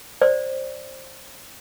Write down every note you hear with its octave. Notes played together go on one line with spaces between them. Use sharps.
C5 D5